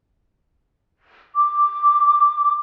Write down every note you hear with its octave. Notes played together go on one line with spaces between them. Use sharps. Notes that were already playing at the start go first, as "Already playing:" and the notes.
D6